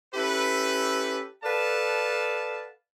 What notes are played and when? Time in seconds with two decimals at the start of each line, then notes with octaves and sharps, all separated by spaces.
0.15 C#4 E4 G4 A4 B4
1.44 A4 B4 D5 F5 F#5 A5